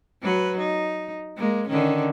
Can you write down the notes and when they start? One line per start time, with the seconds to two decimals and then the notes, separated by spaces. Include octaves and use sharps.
0.22 F#3 B4
0.58 D#4
1.37 G#3 A#3
1.68 D3 D#3 C#4